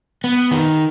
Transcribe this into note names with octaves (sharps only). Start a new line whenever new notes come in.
B3
D#3